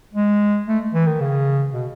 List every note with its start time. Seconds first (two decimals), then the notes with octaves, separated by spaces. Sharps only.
0.14 G#3
0.68 A3
0.94 E3
1.07 D#3
1.21 C#3
1.74 B2